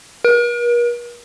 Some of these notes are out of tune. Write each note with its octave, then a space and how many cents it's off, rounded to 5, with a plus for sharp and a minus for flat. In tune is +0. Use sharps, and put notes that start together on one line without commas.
A#4 +45